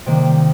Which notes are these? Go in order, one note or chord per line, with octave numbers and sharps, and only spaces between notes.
C3 D#3 A#3